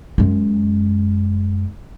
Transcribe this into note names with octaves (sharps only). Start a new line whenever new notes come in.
F#2 G#3